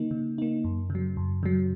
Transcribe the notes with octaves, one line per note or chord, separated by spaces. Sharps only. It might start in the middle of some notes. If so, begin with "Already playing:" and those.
Already playing: C#3 A#3 D#4
C#3
A#3 D#4
F#2
C#3
F#3
F#2
C#3 F#3